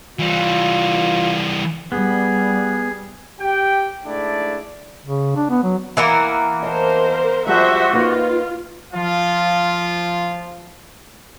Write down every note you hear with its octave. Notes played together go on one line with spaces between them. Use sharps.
E3 G3 F4
G3 B3 G#4
G4 G5
G#2 A3 D4 E4 D5
C#3
D4
B3
F#3
E3 A#3 B3
A#4 C5 D#5 A5
F3 G3 G#3 F#4 G4 C5 E5 F#5
A#3 D#4 F4 B4
F3 F4